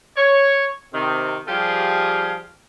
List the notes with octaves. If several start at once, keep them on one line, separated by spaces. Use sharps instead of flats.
C#5
C3 D#3 C4
F3 G3 F4 G4 G#4 F5